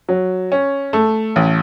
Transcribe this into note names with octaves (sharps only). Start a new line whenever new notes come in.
F#3
C#4
A3
A1